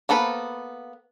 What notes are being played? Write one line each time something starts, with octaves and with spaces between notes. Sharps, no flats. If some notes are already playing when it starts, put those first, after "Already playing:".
A#3 B3 A4 B4 C5